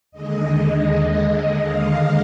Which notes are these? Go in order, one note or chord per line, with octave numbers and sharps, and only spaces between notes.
D#2 D3 G#3 D#5
F5